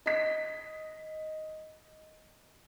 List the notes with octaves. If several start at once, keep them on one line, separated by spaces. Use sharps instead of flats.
D#5 B6